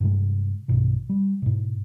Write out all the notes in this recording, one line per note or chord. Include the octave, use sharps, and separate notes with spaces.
G2 C3 G#3
B1 G2 B2 D#3
G3
G#2 B2